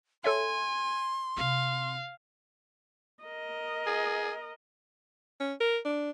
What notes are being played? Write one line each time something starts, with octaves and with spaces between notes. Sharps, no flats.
A4 C#5 E5 G#5 C6
C3 C4 F5
A#4 D#5
G#4
C#4
A#4
D4